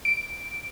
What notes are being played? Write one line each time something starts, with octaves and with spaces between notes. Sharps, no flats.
D7